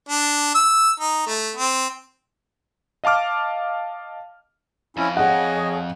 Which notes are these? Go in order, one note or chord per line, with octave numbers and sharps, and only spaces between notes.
D4
E6
D#4
A3
C4
D#5 F5 A5 D6 F6
F2 C#4 E4
G#4 C#5 D#5 F#5 C#6